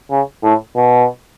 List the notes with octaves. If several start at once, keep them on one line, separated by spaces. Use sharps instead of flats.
C#3
A2
B2